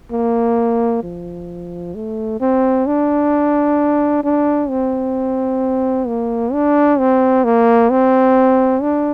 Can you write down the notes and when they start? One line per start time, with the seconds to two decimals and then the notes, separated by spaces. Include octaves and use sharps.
0.12 A#3
1.03 F3
1.95 A3
2.40 C4
2.87 D4
4.24 D4
4.70 C4
6.07 A#3
6.53 D4
6.99 C4
7.45 A#3
7.91 C4
8.82 D4